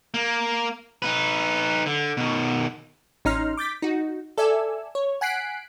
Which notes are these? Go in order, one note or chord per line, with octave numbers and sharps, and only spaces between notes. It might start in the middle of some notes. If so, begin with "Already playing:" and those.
A#3
D#4 B4
D3
B2 D#3
A1 C#4 D#4 A#5 C6 F6
D6 G6 A6 B6
D#4 F#4
A4 D5 E5 G#5 E6
C#5
F#5 G#5 F#6 B6 C7 D7